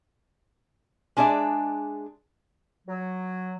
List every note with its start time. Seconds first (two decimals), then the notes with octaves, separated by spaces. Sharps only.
1.17 G#3 D4 G#4 D5 E5
2.87 F#3